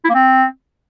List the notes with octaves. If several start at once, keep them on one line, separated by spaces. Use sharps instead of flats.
E4
A#3
C4